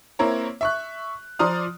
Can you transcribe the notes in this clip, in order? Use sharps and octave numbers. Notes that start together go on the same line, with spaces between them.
A#3 C4 E4 A#4 C#5 A#5
E5 C#6 F#6
F3 D5 A#5 C6 D#6 F6